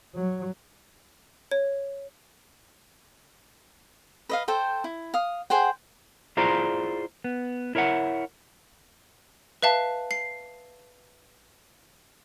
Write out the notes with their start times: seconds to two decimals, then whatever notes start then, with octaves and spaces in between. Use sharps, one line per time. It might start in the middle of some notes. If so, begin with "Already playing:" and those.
0.15 F#3
1.51 C#5
4.29 B4 D#5 F5
4.48 A4 C5 G5
4.84 E4
5.14 F5 D#6
5.50 G#4 C5 F#5 G5
6.37 E4 F4 G#4 C5 D5 A#5
7.24 B3
7.75 E4 A#4 C#5 E5 F#5
9.62 B4 E5 F5 A5
10.11 C7